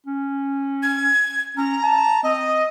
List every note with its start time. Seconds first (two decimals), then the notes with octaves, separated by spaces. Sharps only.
0.07 C#4
0.83 G#6
1.57 C#4 A#5
1.83 A5
2.23 C4 D#5